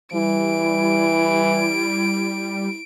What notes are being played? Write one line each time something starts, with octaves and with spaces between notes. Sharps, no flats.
E3 G3 E4 D7